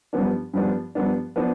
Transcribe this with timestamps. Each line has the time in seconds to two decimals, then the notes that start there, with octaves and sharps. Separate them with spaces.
0.13 G2 F3 B3 D4
0.54 G2 F3 B3 D4
0.95 G2 F3 B3 D4
1.36 F3 B3 D4